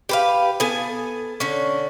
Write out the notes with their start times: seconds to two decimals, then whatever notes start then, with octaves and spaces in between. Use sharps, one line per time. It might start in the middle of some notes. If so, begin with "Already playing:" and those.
0.09 G4 B4 F5
0.60 B3 A4 G#5
1.40 D3 C#4